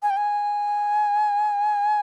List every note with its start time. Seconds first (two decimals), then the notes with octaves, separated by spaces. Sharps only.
0.02 G#5
0.10 G5
0.17 G#5